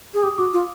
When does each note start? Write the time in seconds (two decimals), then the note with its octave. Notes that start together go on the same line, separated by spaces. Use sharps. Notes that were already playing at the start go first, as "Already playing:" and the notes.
0.14 G#4
0.23 G4 D#6
0.38 F#4 D6
0.53 F4